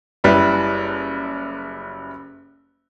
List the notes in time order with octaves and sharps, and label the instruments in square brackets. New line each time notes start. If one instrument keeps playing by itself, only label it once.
[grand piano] F#1 G3 E4 B4